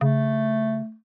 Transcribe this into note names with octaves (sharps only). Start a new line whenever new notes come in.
C#3 A3